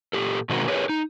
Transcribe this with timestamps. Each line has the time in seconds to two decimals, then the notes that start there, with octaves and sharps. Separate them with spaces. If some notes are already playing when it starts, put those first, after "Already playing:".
0.13 A#2 E3 G4 A4
0.49 B2 D#3 G#3 C4 F#4 A#4
0.68 G4 G#4 A#4 B4 C#5
0.89 D#4